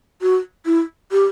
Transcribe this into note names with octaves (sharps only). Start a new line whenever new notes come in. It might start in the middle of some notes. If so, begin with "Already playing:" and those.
F#4
E4
G4